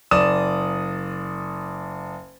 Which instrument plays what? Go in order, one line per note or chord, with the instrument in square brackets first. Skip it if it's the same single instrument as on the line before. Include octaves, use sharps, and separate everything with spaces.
[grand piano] F#1 D5 D#6 E7